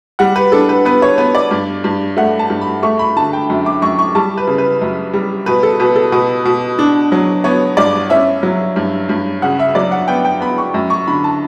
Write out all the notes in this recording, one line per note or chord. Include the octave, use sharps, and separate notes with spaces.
G3 F#5
B4
D4 A4
B4
B3 B4
C#5
B3 B4
D5
G2
G2
A3 F#5
A5
G2
B5
A3 C#6
B5
D3 A5
G5
F#2
D6
F#2 C#6
C#6
G3 A5
B4
C#3
B4
F#2
G3
B2 B4
A4
B2 B4
A4
B2 B4
B2
D4
F#3
B3 C#5
G2 D5
C#4 E5
F#3
G2
G2
C#3 F#5
E5
F#3 D5
F#5
B3 G5
G5
B3 B5
C#6
F#2
C#6
D3 B5
A5